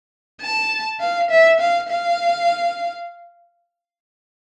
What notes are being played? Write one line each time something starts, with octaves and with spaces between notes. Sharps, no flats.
A5
F5
E5
F5
F5